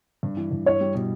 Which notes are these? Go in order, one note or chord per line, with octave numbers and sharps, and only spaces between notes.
G2
E3
G2
E4 C#5
G3
B2